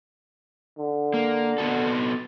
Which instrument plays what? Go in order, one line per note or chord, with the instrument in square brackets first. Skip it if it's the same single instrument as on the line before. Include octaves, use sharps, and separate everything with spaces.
[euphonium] D3
[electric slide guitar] A#3
B3 F#4 A4